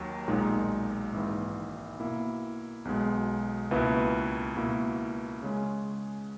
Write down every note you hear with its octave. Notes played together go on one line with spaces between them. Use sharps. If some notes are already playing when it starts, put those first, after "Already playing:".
Already playing: D#2 D#3 F#3
B1 A#2 G#3 D#4
G#1 G#2 E3 A#3
B2 A#3 E4
B1 B2 G#3
C#2 B2 A#3 E4 B4
C#2 B2 A#3 E4
C#3 G#3 C#4 G#4